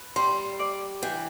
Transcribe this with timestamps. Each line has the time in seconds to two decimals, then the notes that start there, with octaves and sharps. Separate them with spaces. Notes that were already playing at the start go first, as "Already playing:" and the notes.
Already playing: B4
0.16 G3 C6
0.59 D5
1.02 E3 G5